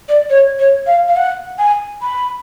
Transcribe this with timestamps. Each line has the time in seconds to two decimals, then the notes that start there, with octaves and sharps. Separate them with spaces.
0.09 D5
0.30 C#5
0.59 C#5
0.87 F5
1.08 F5
1.16 F#5
1.59 G#5
2.02 B5